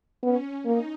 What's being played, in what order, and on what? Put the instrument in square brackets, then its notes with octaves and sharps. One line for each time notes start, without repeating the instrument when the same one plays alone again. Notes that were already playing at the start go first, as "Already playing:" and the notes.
[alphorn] B3 [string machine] C#4
[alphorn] A#3 [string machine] D#4